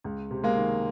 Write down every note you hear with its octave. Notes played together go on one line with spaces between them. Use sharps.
C#2
C3
G#3 A#3
D#3